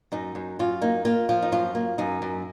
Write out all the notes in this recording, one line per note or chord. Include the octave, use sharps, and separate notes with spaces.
F#2 D#4
F#2
F#2 F4
A#3 D#4
A#3 F4
F3 F4
D#4
F#2 F4
A#3
F#2 D#4
F#2